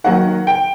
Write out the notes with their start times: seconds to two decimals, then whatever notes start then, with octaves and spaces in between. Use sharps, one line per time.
0.04 D#3 F#3 A#3 F#5
0.47 G5